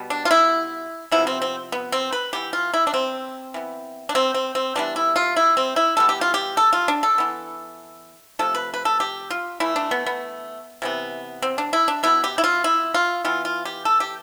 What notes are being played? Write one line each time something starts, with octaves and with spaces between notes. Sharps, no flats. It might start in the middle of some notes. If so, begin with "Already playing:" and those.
Already playing: B2 G3 B3
D4
F4
E4
C3 F3 B3 E4
C4
C4
B3
C4
B4
E3 B3 G4
F4
E4
D4
C4
E3 B3
D4
C4
C4
C4
E3 G3 B3 D4
E4
F4
E4
C4
E4
E3 G3 B3 A4
G4
F4
G4
A4
F4
D4
A4
E3 B3
C3 F3 A3 A4
B4
B4
A4
G4
F4
E3 A3 E4
D4
B3
B3
C3 E3 B3
C4
D4
E4
D4
B2 B3 E4
G4
E4
F4
E4
F4
E3 B3 F4
F4
G4
A4
G4